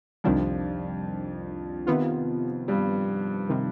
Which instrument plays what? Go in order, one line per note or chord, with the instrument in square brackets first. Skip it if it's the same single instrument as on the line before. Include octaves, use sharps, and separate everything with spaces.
[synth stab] C2 C3 D#3 G3 D4 [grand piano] F2 F3
[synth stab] C3 D#3 B3 F4
[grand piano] G2 G3
[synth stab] C3 D#3